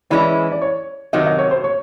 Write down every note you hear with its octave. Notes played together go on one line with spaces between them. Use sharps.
E3 G#3 C#4 E4 D5
D5
C#5
C3 D#3 F#3 D#5
E5
D#5
C#5
C5
C#5